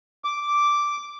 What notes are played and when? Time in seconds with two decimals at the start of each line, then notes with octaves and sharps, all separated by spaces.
0.24 D6